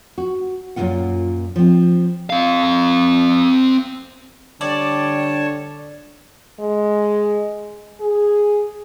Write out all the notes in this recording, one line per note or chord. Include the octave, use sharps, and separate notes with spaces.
F#4
F#2 A#2 E3 F#3 F4 F#5
F3 C4
C4 F5
D3 G3 C#5 D5 A5
G#3
G#4